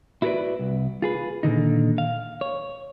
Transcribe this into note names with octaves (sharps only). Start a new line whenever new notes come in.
E4 F#4 G#4 A#4 B4 D5
C2
F4 G#4 B4
A#2 D3 D#3 D#4
F5
C#5